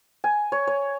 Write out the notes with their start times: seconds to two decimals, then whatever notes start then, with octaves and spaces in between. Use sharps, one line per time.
0.24 G#5
0.52 C#5
0.67 C#5